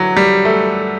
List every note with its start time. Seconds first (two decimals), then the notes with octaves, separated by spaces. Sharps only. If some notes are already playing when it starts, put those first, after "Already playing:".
Already playing: D3 E3 F#3
0.17 G3
0.45 A3